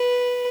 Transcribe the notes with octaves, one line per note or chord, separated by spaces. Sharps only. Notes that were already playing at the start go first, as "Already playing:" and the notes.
Already playing: B4